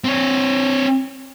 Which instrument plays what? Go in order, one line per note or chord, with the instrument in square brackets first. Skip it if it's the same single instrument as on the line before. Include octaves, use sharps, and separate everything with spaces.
[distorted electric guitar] C4 C#5